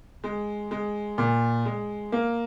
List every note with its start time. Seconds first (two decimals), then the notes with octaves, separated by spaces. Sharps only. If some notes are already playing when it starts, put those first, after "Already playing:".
0.24 G#3
0.71 G#3
1.18 A#2
1.65 G#3
2.12 A#3